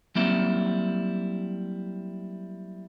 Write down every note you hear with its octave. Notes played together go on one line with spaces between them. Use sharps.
F#3 G3 A#3 C4 E4